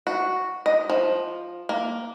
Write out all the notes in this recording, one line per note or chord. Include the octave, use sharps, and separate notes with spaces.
F#4
D#5
F3
A#3